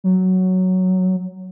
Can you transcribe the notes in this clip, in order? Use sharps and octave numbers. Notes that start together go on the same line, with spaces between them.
F#3